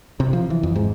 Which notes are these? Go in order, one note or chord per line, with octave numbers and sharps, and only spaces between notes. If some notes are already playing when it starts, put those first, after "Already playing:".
C3
F3
E3
F2
G#2